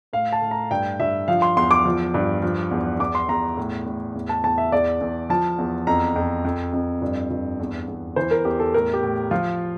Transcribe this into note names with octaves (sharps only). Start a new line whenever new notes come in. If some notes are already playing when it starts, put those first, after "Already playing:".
A2 F5
A5
A2
A#5
G2 G5
G2 E5
F3 F5
C6
E2 C6
D6
F3
G2
F3
E2
E2 D6
C6
E2 A#5
A2
A2
E2
A5
E2 A5
E5
E2 D5
E2
F3 A5
E2
F2 A#5
F2
F2
F2
G2
G2
E2
E2
E3 C5
A#4
E2 G4
A4
A2 A#4
G4
A2
F3 F4